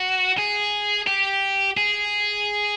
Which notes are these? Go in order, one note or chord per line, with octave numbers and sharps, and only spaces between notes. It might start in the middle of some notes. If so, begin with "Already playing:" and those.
Already playing: F#4
G#4
G4
G#4